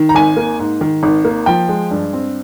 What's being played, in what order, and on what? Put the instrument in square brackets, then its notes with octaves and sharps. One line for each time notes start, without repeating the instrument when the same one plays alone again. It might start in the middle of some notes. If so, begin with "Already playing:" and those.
Already playing: [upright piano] D#3
A#5
G#1 G#5
A#3
G#2
D#3
G#1
A#3
F3 G5
G#3
G2
C4